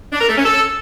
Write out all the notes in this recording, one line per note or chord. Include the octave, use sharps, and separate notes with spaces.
D4
A#4
A3
C#4
A4